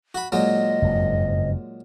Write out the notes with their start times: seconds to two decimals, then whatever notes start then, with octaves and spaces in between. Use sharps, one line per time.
0.15 F#4 B5
0.32 A#2 F#3 G#3 D#5
0.82 F#1 F2 G#2